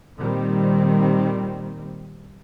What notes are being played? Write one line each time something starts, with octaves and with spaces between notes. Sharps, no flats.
A#2 D#3 G3 C4